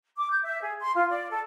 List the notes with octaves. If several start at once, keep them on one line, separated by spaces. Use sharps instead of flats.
D6
G6
E5
G#4
C6
F4
D5
A4